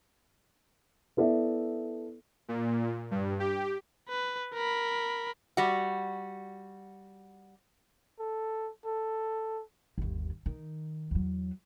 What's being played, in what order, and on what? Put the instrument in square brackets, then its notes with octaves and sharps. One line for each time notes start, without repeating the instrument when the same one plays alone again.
[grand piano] B3 E4 A4 D5 E5
[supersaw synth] A#2
G2
G4
[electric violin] B4
A#4 B5
[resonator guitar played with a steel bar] G3 F#4
[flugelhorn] A4
A4
[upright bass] G1 D#2
D#3
E2 F#3